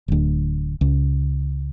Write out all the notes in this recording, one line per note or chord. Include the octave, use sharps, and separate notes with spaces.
D1 D2
C#2